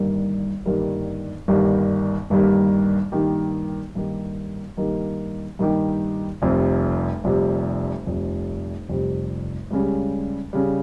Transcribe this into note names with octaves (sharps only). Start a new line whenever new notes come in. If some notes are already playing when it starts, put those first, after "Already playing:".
Already playing: G1 G2 D#3 G3 A#3
G1 G2 D#3 G3 A#3
G1 G2 D#3 G3 A#3
G1 G2 D#3 G3 A#3
G2 D#3 A#3 D#4 G4
G2 D#3 A#3 D#4 G4
G2 D#3 A#3 D#4 G4
G2 D#3 A#3 D#4 G4
F1 F2 C3 G3
F1 F2 C3 G3
F1 F2 C3 G3
F1 F2 C3 G3
C#2 C#3 G3
C#3 G3